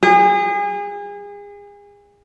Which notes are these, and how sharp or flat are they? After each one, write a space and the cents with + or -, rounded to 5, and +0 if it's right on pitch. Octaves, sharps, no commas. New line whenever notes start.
G#4 -35